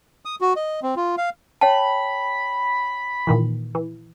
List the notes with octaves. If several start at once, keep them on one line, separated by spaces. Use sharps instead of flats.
D#6
F#4
D#5
C4
F4
F5
C#5 G5 A5 B5
A#2 D#3 E3
E3